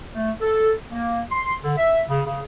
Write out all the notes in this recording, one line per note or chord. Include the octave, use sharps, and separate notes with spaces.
A3
A4
A#3
C6
D3
E5
C#3
C#3